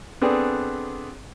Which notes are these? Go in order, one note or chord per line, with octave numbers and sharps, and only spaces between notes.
B3 C4 D4 G#4 A4 B4